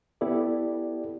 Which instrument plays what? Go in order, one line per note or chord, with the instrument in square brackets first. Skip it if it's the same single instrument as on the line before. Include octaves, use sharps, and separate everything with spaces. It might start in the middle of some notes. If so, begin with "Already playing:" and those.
[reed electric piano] B3 E4 G4 A4 D5